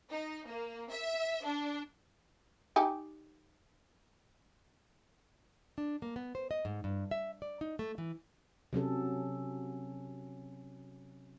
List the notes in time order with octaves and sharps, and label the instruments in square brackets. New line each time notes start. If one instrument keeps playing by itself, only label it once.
[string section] D#4
A#3
E5
D4
[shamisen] D#4 G4 G#5
[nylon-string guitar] D4
A#3
B3
C5
D#5
G#2
G2
E5
D5
D#4
A3
E3
[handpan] C3 F#3 C#4 A4